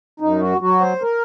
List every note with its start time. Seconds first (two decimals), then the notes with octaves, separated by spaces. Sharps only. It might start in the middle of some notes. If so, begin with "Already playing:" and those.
0.20 F#2 D#4
0.41 F#4
0.61 F#3 F#4
0.81 C5
1.02 A#4